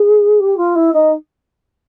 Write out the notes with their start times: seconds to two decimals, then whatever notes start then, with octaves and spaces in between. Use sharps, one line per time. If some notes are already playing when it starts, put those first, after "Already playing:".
Already playing: G#4
0.40 G4
0.57 F4
0.75 E4
0.93 D#4